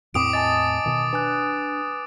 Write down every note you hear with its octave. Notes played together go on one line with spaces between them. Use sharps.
E2 A2 C4 D6 D#6 D7
D#5 G#5 A5 A6
B2 D#3
D4 B4 G#5 F#6